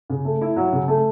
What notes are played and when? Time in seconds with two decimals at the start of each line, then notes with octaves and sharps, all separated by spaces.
0.10 C#3
0.25 A3
0.41 E4
0.56 F#3
0.72 C#3
0.88 A3